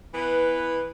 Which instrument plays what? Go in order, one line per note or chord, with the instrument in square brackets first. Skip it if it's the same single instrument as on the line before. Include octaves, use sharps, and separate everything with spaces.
[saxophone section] E3 B3 B4